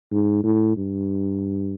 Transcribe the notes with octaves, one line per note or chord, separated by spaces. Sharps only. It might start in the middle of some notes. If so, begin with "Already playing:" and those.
G#2
A2
G2